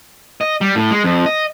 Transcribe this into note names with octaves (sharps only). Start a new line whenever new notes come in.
D#5
G3
A2
G#3
F2
D#5